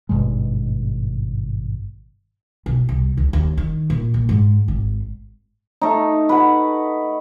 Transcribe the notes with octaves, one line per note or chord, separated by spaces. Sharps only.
G#1 G2 B2 G#3
B1
C2
C#2
D#2
D#3
A#2
A#1
G#2
G#1
A3 D#4
B4 F#5